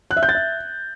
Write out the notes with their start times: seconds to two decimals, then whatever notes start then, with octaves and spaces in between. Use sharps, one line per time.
0.11 F#6
0.17 E5
0.23 G6
0.29 A6
0.35 E5